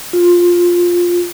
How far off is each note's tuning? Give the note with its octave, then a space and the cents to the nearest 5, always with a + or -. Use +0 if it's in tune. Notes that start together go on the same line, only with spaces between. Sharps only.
F4 +10